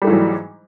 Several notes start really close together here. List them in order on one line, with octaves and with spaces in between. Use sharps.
G3 A3 G#2 E3 F#3